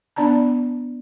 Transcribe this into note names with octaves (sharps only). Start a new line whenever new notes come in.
B3 D4 D5 A5 A#5